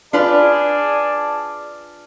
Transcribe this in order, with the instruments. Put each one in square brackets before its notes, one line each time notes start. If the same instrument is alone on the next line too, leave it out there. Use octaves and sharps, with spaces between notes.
[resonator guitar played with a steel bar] D4 F4 B4 [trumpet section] G#4 D5 A5